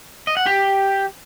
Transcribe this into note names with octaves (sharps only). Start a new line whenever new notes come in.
D#5
F#5
G4